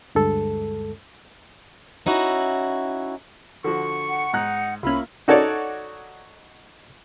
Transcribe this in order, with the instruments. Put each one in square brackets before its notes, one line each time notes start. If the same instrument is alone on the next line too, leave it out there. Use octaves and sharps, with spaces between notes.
[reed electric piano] D2 G2 G#3 A4
[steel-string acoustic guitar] C#4 D#4 E4 F#4
[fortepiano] D3 F3 F#4 [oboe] C#6
[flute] F#5
[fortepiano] G#2 A#5 F#6 [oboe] D#4
[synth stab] C2 C#4 [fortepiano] A#3 F4 [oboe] E5 [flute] B5
[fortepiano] D#4 F#4 A4 C#5 D5